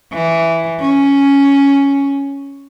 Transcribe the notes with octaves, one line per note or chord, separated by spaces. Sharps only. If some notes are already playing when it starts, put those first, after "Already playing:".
E3
C#4